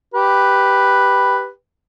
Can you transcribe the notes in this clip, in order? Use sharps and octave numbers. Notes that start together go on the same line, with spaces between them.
G4 B4